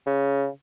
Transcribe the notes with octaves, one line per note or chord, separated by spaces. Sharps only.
C#3